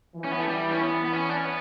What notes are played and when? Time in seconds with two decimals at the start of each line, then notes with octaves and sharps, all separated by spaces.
0.16 E3
0.24 C#4
0.32 B3
0.40 A3
0.48 G3
0.71 C#4
0.80 B3
1.05 B3
1.13 C#4
1.29 D4
1.36 C#4
1.45 B3